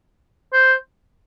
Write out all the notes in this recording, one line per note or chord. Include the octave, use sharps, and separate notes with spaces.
C5